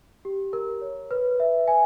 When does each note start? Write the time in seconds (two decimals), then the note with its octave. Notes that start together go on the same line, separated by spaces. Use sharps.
0.25 G4
0.53 A#4
0.81 C#5
1.11 B4
1.40 E5
1.68 G#5